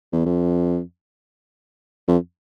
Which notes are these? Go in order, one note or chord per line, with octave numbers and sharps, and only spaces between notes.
E2
F2
F2